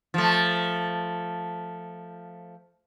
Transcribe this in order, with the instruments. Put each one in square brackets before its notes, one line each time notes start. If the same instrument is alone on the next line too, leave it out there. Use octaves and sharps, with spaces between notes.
[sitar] F3 A3